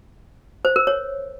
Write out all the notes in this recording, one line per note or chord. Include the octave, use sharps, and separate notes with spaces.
C5
A#4
C#5